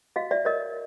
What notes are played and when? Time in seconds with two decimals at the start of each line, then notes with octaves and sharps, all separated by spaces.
0.16 F#4 D#5 F5
0.31 D5 E5
0.45 A#4 C#5 D#5